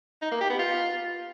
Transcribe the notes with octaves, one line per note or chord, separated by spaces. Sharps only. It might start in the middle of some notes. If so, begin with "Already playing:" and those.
D#4
A#3
G4
B3
F4